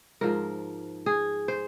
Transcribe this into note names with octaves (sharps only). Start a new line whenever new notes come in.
G#2 F3 A#4
G#4
C5